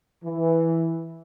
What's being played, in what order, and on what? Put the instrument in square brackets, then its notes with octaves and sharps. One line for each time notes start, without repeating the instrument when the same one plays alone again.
[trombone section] E3